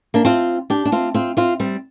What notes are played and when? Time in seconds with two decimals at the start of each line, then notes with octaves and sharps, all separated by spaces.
0.14 A#3 D4
0.25 C4 F4
0.70 D4 G4
0.85 D4
0.92 C4 F4
1.14 C4 F4
1.37 C4 F4
1.60 G3 C4